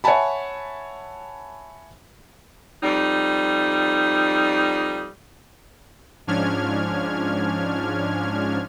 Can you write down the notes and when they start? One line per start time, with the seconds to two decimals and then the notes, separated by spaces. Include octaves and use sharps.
0.04 C#5 E5 F#5 G#5 A5 B5
2.82 F2 G3 D#4
6.27 G#2 F3 C#4 D4 F6 G#6